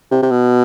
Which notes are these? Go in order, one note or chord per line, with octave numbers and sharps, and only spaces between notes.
C3
C3
B2